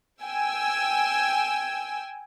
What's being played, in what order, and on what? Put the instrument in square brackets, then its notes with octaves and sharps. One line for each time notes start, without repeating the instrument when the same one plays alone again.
[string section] G5 G#5 E6